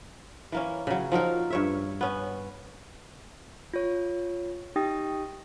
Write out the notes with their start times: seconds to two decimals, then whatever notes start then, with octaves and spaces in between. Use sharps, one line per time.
0.52 E3 A#3 C#4
0.87 C#3 F#3
1.12 F3 F#3 D#4 A#4
1.50 G2 C#5 E5
2.01 B3 C#4
3.74 F4 C#5
4.76 D#4 G4 G5 D#6 A#6